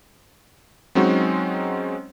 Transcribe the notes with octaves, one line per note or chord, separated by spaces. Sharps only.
F#3 G#3 C4 C#4 D#4 F#4